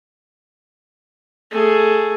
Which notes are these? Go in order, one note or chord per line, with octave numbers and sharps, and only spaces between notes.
A3 G#4